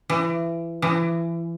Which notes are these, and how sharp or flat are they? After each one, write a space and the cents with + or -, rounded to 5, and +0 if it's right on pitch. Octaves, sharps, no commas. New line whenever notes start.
E3 +25
E3 +25